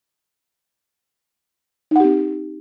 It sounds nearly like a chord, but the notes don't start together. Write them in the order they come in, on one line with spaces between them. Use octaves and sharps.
D#4 F#5 G4 C4